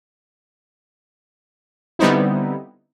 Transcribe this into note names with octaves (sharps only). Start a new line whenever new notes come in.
D3 G3 B3 C4 D#4 E4